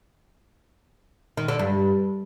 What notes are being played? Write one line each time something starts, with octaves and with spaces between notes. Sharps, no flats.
D#3
D3
G2